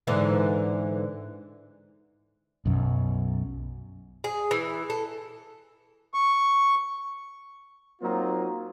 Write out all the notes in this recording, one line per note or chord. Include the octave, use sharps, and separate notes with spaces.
G#2 D3 E3
B1 F#2
G#4
E3
A4
C#6
F#3 A#3 C4 D#4 F4